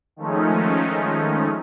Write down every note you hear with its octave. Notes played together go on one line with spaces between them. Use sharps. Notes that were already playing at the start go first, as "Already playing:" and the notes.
D#3 F3 G#3 A3 C#4 D#4